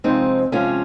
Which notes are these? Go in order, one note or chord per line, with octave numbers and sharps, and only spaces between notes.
C3 F3 G#3 C4 D#4
C3 F3 G#3 C#4 F4